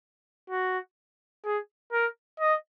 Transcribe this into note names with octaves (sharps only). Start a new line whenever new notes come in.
F#4
G#4
A#4
D#5